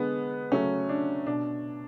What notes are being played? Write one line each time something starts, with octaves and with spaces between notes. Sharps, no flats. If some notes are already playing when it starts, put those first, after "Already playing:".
Already playing: D3 G#3 B3
C#3 F#3 A3 C#4
D4
B2 D4